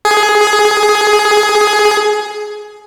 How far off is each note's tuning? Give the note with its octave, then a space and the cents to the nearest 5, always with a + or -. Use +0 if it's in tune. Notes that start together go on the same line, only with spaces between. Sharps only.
G#4 +15